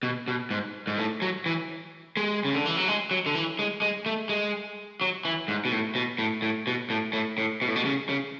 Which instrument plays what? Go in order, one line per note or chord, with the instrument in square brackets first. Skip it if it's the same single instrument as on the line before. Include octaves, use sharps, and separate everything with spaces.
[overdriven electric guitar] B2
B2
G#2
G#2
A2
F#3
E3
G#3
C#3
D3
E3
F#3
G#3
F#3
D3
E3
G#3
G#3
A3
G#3
F#3
E3
G#2
B2
A2
B2
A2
A2
B2
A2
A2
A2
B2
A2
B2
C#3
C#3